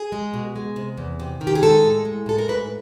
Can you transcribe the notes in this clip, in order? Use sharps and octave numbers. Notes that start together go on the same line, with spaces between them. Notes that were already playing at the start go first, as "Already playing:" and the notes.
Already playing: G#4
G#3
B2
G#3
C3
E2
C3
D#3
G4
G#4
G#3 A4
A2
G#3
A2 A4
A#4
G#2 B4